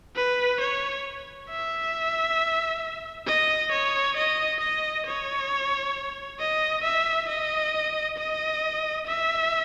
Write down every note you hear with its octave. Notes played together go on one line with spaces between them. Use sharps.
B4
C#5
E5
D#5
C#5
D#5
D#5
C#5
D#5
E5
D#5
D#5
E5